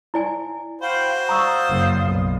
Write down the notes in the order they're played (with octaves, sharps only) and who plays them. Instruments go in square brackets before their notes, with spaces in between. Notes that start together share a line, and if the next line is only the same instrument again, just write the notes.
[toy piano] E4 D5 G#5
[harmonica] F#4 C5 [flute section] F5 G5 B5
[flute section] D5 F5 D#6 [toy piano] A#5 C#6 E6
[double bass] F#1
B1 F#2